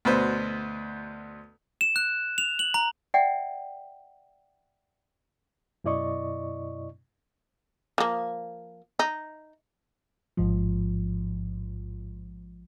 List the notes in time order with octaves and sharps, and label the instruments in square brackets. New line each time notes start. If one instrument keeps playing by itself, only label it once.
[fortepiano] D2 B2 B4 C5
[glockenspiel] E7
F#6
F7
F#7
A#5
[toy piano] D5 E5 F#5 G5
[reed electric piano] F#2 B2 E4 D5 D#5 C#6
[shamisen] F3 A#3
D#4
[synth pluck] A1 G#2 F3